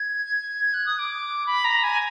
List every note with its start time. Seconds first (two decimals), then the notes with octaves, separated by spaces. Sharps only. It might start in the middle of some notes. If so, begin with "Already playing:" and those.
Already playing: G#6
0.74 F#6
0.86 D#6
0.99 D6
1.47 B5
1.65 A#5
1.83 G#5